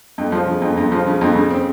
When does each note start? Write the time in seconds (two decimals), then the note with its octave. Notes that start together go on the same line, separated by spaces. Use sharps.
0.18 F2
0.32 F3
0.48 C#3
0.62 F2
0.77 F2
0.92 F3
1.06 C#3
1.21 F2
1.36 C#3
1.50 C4